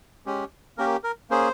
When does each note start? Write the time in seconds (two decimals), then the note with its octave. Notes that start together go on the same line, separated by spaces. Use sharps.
0.26 G#3 C#4 G4
0.78 A#3 C#4 G4 A#4
1.04 A#4
1.30 A#3 C#4 G#4 C5